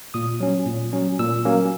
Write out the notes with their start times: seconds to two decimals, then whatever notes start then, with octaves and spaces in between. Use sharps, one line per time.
0.14 A#2 D#6
0.40 F#3 C#4
0.66 A#2
0.93 F#3 C#4
1.19 A#2 E6
1.45 F#3 A#3 C#4